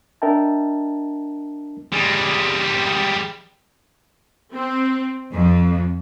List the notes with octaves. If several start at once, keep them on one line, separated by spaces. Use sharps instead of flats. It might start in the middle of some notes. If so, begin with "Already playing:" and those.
D4 A#4 D#5 E5 G5 A5
G3 G#3
C4
F2